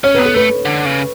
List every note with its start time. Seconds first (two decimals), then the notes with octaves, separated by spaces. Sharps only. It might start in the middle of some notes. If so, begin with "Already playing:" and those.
0.04 C#4 C#5
0.14 B3 B4
0.25 A4
0.34 A3 B4
0.65 D3
0.85 C#3